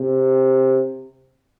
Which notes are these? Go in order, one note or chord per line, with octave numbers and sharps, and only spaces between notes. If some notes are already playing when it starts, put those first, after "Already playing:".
Already playing: C3